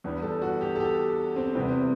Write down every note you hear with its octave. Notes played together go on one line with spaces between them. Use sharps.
E2 D3 G3
A4
F#4
G4
A4
G4
C4
E2 C3 E3 G3 C4